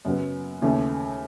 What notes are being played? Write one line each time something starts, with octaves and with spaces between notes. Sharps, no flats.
F#2 C#3 F#3 B3
D#2 C#3 E3 A3